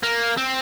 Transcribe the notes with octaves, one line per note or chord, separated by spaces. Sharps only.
A#3
C4